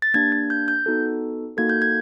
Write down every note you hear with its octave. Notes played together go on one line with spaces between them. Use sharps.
A6
A#3 D4 G4 G#6
G#6
G6
G6
B3 D#4 F#4 A4
A#3 D#4 F#4 A4 G#6
G6
G#6